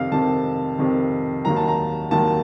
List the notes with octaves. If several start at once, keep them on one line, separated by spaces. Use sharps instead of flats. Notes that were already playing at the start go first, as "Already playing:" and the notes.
Already playing: F2 C3 D#3 F5
F2 C3 D#3 A5
F2 C3 D#3
D#2 D#3 F#3 A#5
A5
A#5
D#2 D#3 F#3 A5